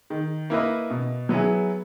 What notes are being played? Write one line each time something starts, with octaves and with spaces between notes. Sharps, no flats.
D#3
A#3 E4 B4 D#5
B2
F#3 B3 E4 G#4